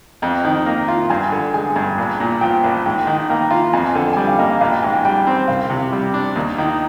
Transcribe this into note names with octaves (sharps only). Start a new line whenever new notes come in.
F2 G5
D#3
A#3
F4
G2 G#5
D3
G#3 G#5
G2
A#1
A#2
F3 G5
A#1
G#2 G5
D#3
A#3 G5
F4
F2 G#5
D3 G5
G#5
G3 G5
F5
A#3 D#5
F5
A#1 F5
G5
G#2 G#5
G5
G3 G5
C4
C2 F5
C3
G3
D4
D#2
D#3